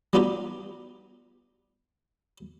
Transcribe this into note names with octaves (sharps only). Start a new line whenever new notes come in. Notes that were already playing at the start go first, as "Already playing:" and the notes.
G3 B3 D4 D#4 F4 G4